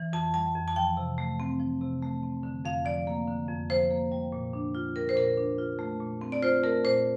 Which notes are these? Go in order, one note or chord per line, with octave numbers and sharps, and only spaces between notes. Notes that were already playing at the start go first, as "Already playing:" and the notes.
Already playing: E3
F2 A5
G3 A5
F2
A5
F3 G5
C3
A3
C4
F3
C3
A3
C4
D3
F2 F5
F3 D5
A#3
D3
F2
F3 C5
A#3
G3
A#2
D4
F4
G3 A#4
C5
A#2 A#4
D4
F4
A3
A#2
C4
D5
F4 C5
A3 A#4
A#2 C5